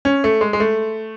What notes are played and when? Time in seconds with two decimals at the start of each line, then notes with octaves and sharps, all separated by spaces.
0.05 C#4
0.24 A3
0.41 G#3
0.53 G#3
0.60 A3